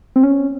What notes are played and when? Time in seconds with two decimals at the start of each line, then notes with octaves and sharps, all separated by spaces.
0.16 C4
0.23 C#4